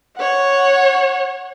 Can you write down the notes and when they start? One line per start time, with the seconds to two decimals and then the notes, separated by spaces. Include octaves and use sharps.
0.17 C#5 F#5